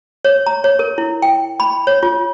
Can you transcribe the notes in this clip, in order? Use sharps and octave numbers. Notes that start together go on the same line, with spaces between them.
C#5
A#5
C#5
A#4
E4
G5
B5
C#5
F4